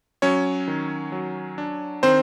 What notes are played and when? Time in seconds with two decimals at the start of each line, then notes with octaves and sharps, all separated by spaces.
0.22 F#3 C#4 C#5
0.68 D#3
1.12 F#3
1.58 D4
2.03 D#3 C4 C5